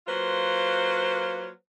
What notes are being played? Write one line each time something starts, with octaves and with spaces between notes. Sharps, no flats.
F#3 A#3 F4 B4 C5